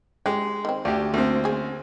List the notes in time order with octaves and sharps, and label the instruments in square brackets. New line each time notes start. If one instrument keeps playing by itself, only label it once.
[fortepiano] G#3 [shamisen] G4
[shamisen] D#3 C4
[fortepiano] D2 G4 [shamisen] D5
[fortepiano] D2 C4 [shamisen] A#3
[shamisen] C#4 G#4